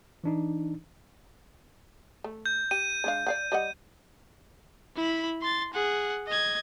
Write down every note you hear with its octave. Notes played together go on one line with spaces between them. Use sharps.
E3 D4 D#4
A3
G6
G4 D#7
G#3 D4 F5
D5 F5 F#5
G3 D#5 F#5
E4 B5
C6 A6
G#4 F#5
D#5 G#6